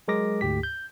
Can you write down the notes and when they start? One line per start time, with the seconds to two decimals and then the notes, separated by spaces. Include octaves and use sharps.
0.08 F#3 G#3 G#4 A#4 D6 A#6
0.41 D2 G#2 G4 B6
0.63 G6